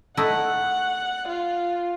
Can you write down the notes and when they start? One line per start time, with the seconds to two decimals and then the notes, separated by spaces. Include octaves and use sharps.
0.17 A3 D#4 E4 F#5
1.28 F4